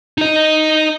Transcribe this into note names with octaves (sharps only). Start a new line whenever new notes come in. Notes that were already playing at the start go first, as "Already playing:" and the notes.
D#4 D#5